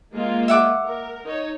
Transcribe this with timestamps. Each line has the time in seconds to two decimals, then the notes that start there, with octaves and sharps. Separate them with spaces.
0.13 G#3 A#3 F4
0.48 E5 F#5 D6
0.85 A#4
1.24 D#4 C#5